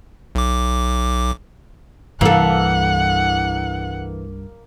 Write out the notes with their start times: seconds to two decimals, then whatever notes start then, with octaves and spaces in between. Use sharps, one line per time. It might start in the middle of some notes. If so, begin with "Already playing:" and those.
0.35 B1 D6
2.21 C2 G2 E3 A#3 A4 F#5